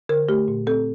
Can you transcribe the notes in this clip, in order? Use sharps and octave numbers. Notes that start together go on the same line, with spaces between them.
D3 A#4
A3 G4
A#2
C4 A4